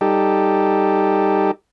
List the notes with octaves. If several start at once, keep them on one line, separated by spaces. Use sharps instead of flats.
G3 D#4 G4 A4